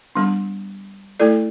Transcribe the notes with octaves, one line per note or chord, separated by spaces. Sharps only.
G3 B3 D4
A3 E4 A4 D5